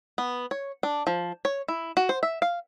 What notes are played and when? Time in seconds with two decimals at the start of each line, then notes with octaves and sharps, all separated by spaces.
0.18 B3
0.51 C#5
0.83 D4
1.07 F3
1.45 C#5
1.68 E4
1.97 F#4
2.09 C5
2.23 E5
2.42 F5